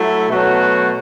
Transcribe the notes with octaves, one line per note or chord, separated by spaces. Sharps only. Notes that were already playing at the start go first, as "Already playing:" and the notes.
Already playing: F#3 A3 E4
B2 F#3 A3 F#4